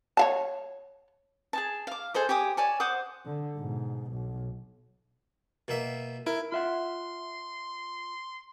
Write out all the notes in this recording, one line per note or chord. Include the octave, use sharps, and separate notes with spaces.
C#5 F5 A5
G#4 G#5 A5
F5 D6
G#4 A4 C5 D#5
G4 G#5 D6 D#6
C#5 D5 G#5 A5
C5 F#5 D6 D#6
D3
G#2 B2
B1
B2 A#3 E5
E4 A#4
F4 E5 F#5 C6